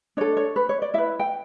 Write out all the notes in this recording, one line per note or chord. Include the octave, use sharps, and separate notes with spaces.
D4 A4 C#5
C#5
B4
C#5
D5
E4 B4 E5
G5